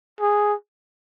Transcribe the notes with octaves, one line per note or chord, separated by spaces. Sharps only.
G#4